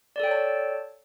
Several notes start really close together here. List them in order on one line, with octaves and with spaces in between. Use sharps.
D5 A4 G5 C#5 A5